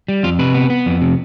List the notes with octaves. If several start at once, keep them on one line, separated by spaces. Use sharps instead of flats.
G3
F2 F4
C3 B4
B3
B3
F2
C3